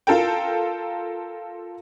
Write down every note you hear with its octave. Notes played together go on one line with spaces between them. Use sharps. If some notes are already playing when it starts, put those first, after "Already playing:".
F4 A4 A#4 G5